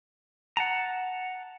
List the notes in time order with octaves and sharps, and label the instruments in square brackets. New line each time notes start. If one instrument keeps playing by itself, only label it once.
[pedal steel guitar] F#5 A5 A#5